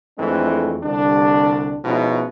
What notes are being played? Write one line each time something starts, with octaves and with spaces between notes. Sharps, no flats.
F2 E3 G#3 A3 C4 D4
C2 D3 G3 D4
B2 F3 G#3 C#4 D#4 E4